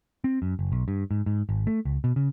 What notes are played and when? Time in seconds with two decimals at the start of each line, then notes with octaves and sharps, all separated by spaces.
0.24 C4
0.42 F#2
0.59 F#1
0.72 B1
0.88 G2
1.11 G#2
1.26 G#2
1.49 G#1
1.67 A3
1.85 C#2
2.04 B2
2.16 C#3